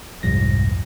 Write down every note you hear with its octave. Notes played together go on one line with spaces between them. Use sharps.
C2 F2 G#2 F3 A#6